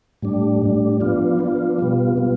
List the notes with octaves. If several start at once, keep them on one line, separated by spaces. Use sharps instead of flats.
A2 G3 D4
A2 G3 D4
F3 B3 D4 F4
F3 B3 D4 F4
B2 G3 B3 F4
B2 G3 B3 F4